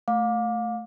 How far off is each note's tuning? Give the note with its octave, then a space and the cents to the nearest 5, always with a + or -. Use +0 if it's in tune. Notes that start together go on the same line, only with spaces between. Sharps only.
A3 +0 F5 +30 D6 +0